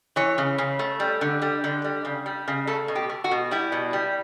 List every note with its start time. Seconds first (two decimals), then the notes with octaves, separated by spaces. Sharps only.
0.16 E3 C#5
0.38 C#3
0.58 C#3
0.79 A3
1.00 G3
1.21 D3
1.42 G3
1.64 D3
1.84 G3
2.05 C#3
2.26 G3
2.48 C#3
2.67 A3 A4
2.88 B2
2.95 G4
3.10 A3
3.24 F#4
3.31 B2
3.51 G3 E4
3.72 B2
3.93 G3